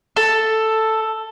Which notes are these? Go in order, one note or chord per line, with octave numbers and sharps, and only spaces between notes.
A4